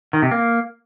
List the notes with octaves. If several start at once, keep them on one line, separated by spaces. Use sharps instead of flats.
D#3
C3
A#3